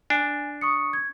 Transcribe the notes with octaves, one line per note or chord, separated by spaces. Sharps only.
D4 G#5
C#6 D#6 C#7
G#6